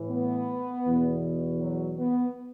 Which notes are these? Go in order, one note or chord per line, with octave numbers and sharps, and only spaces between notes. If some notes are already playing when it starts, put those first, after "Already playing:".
Already playing: A2 E3
B3
E2 B2
F#3
B3